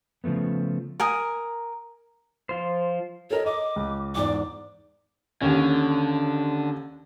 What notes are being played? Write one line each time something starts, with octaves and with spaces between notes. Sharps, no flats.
C#3 F3 G3 A3 B3
A#4 G#5 D#6
F3 F4 C5
A4 A#4 C#5 D#5
D#5 D6
C#2
E2 G#2 D5 D6
D#2 D3 C#4